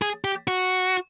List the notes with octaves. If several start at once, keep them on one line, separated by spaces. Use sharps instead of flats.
G#4
G4
F#4